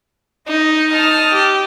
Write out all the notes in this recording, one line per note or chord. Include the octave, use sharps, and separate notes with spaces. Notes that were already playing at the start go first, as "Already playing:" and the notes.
D#4 D#5
A5 D#6 F6
G4